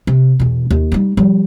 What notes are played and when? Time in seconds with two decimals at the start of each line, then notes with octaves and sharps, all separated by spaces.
0.07 C3
0.40 E2 B2
0.71 D#2
0.92 G3 D#4
1.17 F3 G3